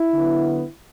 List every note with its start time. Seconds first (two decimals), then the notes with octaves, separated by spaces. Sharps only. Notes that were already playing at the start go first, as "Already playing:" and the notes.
Already playing: E4
0.13 D3 F#3 B3